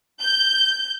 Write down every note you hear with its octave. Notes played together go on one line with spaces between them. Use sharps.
G6